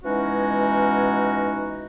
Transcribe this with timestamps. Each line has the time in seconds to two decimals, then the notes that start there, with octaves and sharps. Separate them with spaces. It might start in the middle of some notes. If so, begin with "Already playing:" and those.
0.04 B2 E3 G#3 C#4 D#4 F#4